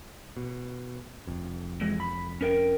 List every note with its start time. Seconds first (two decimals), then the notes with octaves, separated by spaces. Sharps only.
0.37 B2
1.27 F1 F2
1.81 E3 G#3
2.00 B5
2.41 C#4 A#4 G5